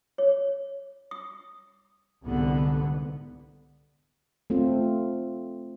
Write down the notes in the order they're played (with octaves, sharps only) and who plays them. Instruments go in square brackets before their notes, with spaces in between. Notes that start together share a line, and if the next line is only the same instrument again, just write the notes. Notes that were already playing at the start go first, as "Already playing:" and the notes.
[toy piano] C#5
D#6
[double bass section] C2 G#2 D3 B3
[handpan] A3 C4 F4